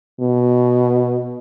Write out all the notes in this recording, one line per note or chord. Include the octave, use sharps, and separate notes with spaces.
B2